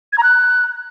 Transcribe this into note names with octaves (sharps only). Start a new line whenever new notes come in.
G#6
A#5
F#6